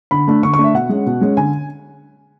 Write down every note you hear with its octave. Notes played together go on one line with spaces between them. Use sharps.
D3 B5
A3 D4
D3 C#6
C#6
A3 D4
E5
B2 F#5
G#3 C#4
B2
G#3 C#4
D3 G#5